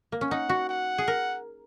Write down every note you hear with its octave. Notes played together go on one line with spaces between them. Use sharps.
A#3
C#4
D#4 F#5
F#4
F#5
G#4
A#4